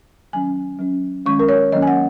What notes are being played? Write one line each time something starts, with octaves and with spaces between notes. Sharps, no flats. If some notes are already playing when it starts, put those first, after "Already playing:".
D#3 F#3 C#4 G#5
F#3 C#4
D#3 G#3 C#4 C#6
A#4
C#5
D#3 F#3 A#3 C#4 D#5
G#5
F#5